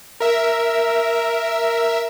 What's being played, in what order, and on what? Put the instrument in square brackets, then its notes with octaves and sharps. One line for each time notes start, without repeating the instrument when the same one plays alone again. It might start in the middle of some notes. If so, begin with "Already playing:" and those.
[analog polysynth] A#4 E5